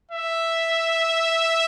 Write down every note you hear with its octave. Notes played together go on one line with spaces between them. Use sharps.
E5